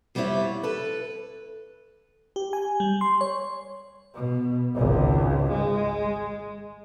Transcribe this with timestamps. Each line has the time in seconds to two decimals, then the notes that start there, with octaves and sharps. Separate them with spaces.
0.15 F2 G3 A#3 B3 E4 C#5
0.63 A4 B4
2.36 G4
2.53 G#5
2.80 G3
3.01 C6
3.21 C#5
4.14 B2
4.75 G#1 C#2
5.52 G#3